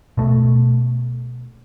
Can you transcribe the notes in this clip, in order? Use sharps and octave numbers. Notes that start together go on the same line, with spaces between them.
B2 A3